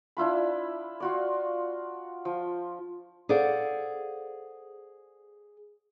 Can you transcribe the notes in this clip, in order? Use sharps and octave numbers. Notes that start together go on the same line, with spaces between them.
D4 E4 F4 B5
F4 F#4 D5
F3
G#4 A4 C5 D5 F5 F#5